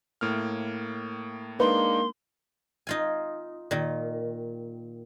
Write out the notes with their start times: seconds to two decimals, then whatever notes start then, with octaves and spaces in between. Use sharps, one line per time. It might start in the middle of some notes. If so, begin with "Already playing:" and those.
0.21 A2 A#3 F6
1.60 G#3 A#3 D4 D#4 B4 C6
2.87 D#4 F4 G#5
3.71 A#2 D#3